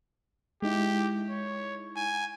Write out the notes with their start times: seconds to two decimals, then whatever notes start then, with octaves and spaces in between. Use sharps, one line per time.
0.62 G#3 D#4 E4 G4
1.29 C#5
1.96 G#5